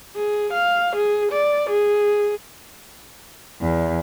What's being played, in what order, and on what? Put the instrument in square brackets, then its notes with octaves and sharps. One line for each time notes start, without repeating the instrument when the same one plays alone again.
[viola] G#4
F5
G#4
D5
G#4
[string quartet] E2